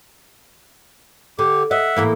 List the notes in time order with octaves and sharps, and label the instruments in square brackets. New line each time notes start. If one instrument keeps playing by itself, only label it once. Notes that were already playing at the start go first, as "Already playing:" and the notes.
[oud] D3 [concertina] G4
[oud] D#5 [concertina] E5 F#5
[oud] A2 E3 A#3